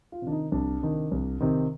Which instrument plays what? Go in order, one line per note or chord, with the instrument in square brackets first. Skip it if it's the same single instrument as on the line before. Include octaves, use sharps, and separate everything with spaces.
[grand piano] F4
C3 D#3 D4
D#4
C2 D4
C3 D#3
C2
C3 D#3